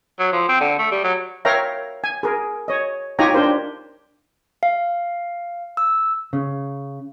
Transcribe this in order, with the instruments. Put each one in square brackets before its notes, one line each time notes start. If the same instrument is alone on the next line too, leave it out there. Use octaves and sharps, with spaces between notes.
[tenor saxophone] F#3
F3
C4
D3
A3
G3
F#3
[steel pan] A#4 C#5 E5 F5 G5 A#5
G#5
G#4 A#4
C#5 D#5
D#4 F4 G4 C#5 G#5 A#5
D4 G4 A#4 C5
[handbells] F5
E6
[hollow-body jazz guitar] C#3